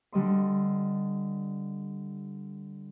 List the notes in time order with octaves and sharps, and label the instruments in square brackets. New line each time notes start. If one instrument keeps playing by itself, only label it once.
[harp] D3 G3 D#5 C6